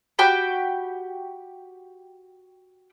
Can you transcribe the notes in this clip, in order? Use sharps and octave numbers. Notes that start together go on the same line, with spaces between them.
F#4 G4 G5 B5